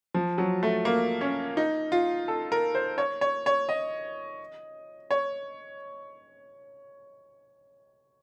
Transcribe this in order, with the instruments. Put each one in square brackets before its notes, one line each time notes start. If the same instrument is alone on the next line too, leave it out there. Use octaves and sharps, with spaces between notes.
[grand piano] F3
F#3
A3
A#3
C#4
D#4
F4
A4
A#4
C5
C#5
C#5
C#5
D#5
C#5